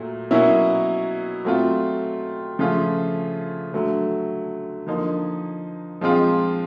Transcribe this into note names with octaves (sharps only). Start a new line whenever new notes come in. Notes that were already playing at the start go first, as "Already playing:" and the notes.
Already playing: A#2 F#3 A3
B2 F#3 A#3 C#4 E4
F#3 A3 C4 F4
C#3 F3 A3 C#4 F4
D3 F#3 A3
D3 F3 A#3 D#4
F3 G#3 C4 F4